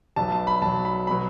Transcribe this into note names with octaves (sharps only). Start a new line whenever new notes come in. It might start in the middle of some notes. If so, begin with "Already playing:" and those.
B1 B2 F#3 A5
A5
B5
B1 B2 F#3 A5
B5
B5
B2 F#3